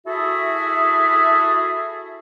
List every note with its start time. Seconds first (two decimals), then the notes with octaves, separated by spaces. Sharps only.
0.07 E4 F#4 G#4 A4 E5